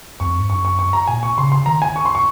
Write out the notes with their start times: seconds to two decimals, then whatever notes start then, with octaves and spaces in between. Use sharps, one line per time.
0.20 F2 C#6
0.39 G#2
0.49 F#2 C#6
0.65 C#6
0.79 C#6
0.93 A#5
1.07 A#2 G#5
1.23 C#6
1.38 C#3 C6
1.52 C6
1.66 D#3 A#5
1.82 G#5
1.96 C#6
2.05 C6
2.15 C#6